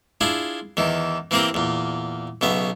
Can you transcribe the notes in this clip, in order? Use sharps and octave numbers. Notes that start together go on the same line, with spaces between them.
D4 E4 F4 G#4
E2 D#3 E3
E3 A#3 C4 G4 A#4
E2 A#2
B1 C#3 B3 E5